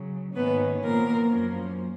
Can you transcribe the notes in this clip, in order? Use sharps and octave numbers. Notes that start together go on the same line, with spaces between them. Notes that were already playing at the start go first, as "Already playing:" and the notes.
Already playing: C#3 F#3
G#2 D#3 A#3 B3 C#4 B4
A#2 F3 A#3 B3 A#4
F#2 F3 A#3 C#4